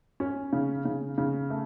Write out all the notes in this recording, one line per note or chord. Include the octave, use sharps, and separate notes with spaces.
C#4
C#3
C#3
C#3
A3